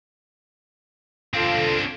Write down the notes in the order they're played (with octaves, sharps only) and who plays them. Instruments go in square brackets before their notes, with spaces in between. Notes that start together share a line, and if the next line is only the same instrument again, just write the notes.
[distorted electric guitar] C4 D4 [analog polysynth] F4 A4